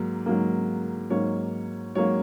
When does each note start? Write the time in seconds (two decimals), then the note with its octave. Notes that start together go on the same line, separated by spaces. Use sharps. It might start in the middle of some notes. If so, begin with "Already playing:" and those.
Already playing: G#2 F#3 A#3
0.26 G#2 F#3 A#3
1.10 G#2 F#3 A#3 C#5
1.95 G#2 F#3 A#3 C#5